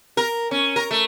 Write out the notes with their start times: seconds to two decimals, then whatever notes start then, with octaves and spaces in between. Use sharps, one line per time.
0.17 A#4
0.51 C#4
0.76 A#4
0.91 A3